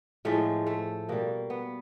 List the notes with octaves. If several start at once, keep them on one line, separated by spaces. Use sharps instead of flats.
A2 F3 G#3 A3
A3
B2 G3 A#3
B3